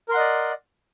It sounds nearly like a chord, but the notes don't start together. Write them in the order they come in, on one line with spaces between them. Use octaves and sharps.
A#4 C6 F#5 D#5 D5